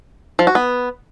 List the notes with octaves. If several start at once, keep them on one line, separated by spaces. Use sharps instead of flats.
F3
F#4
B3